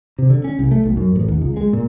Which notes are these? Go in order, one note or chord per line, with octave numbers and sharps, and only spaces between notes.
C3
D3
C#4
C2
A3
B1
F#2
A1
D#2
C#2
G#3
A#2